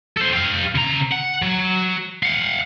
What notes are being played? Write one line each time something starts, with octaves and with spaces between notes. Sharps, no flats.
A4 C5
G4 F5
C#3 A#5
F#5
F#3
F5 F#5